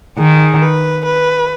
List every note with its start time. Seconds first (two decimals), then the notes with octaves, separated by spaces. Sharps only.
0.18 D#3 G#4
0.61 B4
1.05 B4